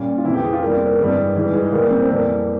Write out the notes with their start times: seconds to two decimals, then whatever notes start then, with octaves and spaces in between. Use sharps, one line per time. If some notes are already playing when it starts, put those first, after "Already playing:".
Already playing: A#2 G3 C#4
0.18 F4
0.25 F2 C3 E3 E4
0.34 G4
0.43 G#4
0.53 F4
0.62 F2 C3 G3 A#3
0.74 C4
0.86 A#3
0.99 G2 E3 G3 G#3
1.35 G#2 E3 G3 G#3
1.53 G#3
1.72 A#2 G3 A#3
1.90 C4
2.02 C4
2.09 F2 E3 G3 A#3